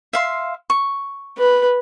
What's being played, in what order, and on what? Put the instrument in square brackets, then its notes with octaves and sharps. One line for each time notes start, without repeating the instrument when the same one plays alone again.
[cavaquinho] E5 F5 C6
C#6
[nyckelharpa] B4